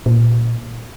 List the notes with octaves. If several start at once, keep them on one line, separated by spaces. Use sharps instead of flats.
A#2